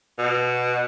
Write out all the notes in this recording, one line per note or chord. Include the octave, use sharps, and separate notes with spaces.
B2